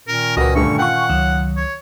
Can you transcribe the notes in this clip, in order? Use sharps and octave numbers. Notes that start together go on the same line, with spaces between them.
A#2 D#3 C#4 A#4
C#2 F#4 A#4 B4 D#5
G2 D3 A3 C#6
F4 F#5 G5 C#6
C#2 D#3 F#3
C#5